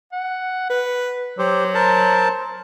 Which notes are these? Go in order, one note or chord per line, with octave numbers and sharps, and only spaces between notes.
F#5
B4
F#3 G4 C5
A#4 C5 A5